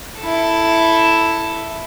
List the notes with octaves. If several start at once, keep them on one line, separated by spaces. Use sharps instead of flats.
E4 A4